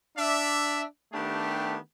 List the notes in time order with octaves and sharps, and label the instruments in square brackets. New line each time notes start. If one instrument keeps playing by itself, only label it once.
[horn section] D4 D5 E5
D#3 A3 B3 D4 G4